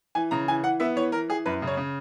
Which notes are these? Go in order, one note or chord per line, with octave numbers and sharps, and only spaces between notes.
E3 G#5
C#3 A#5
E3 G#5
E3 F#5
B3 E5
E3 C#5
E3 A#4
E3 G#4
F#2 B4
C#3
C#5
C#3